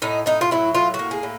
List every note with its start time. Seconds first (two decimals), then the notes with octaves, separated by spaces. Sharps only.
0.02 A2 D#4
0.26 A2 D#4
0.41 F4
0.51 F#3 E4
0.75 A2 F4
0.94 F#4
0.99 A#3
1.11 G#4
1.23 A2